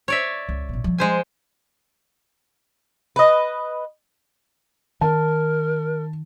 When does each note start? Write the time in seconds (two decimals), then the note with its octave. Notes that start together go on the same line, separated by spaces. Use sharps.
0.08 C#5 D5 E5
0.49 C#2
0.69 A1 B2
0.84 F3 G3
0.98 G#3 C5 G#5
3.16 B4 D#5
5.01 D#3 A#4 A5